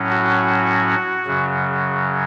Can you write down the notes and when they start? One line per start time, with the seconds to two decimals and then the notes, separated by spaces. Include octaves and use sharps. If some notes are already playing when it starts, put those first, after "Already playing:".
Already playing: A2 F#3 C#4
0.10 F#4
1.26 F#2 C#3 F#3